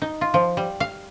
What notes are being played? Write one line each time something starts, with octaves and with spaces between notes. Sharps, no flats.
D#4
F4
F3
G3
F5